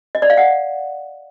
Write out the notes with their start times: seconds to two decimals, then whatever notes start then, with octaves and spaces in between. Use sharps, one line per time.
0.15 D#5
0.22 D5
0.30 F5
0.37 F#5